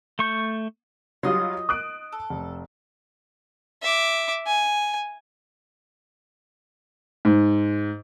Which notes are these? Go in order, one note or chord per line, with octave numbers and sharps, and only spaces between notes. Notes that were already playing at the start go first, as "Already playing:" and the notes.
A3 C#6 G6
F#3 G3 D#4 F4 D#5 C6
D#6 F#6 D7
A4
F1
E5 D6
G#5
G#2